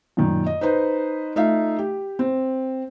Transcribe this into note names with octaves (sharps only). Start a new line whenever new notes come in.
F#2 A#2 D#3
D#5
D#4 B4 C5 D#5
A3 D#4 F4 E5 F5
G4
C4